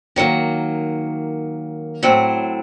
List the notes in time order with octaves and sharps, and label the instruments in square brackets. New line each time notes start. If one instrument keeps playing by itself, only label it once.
[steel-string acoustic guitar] D#3 F#3 A#3
A2 F#3 C4